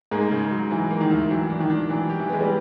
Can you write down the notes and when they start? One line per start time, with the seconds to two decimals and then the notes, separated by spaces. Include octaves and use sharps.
0.11 G#2 G#3 A#3
0.31 C#3
0.51 F#3
0.71 E3 F#3
0.90 A#3
1.01 D#3
1.10 D2
1.30 E3 F#3
1.50 D4
1.60 D#3
1.70 D4
1.90 E3 F#3
2.10 G4
2.19 E3
2.29 G#3 B3
2.41 G3